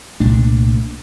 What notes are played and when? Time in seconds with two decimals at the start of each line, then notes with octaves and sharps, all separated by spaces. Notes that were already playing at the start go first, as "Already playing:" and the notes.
0.20 C2 A#2 A3 D4